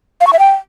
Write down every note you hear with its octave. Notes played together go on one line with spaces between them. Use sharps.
F5
C#6
E5
G5